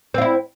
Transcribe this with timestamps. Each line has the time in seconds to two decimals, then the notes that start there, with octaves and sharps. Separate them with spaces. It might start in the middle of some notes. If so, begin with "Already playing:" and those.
0.14 C4
0.18 F4
0.22 E4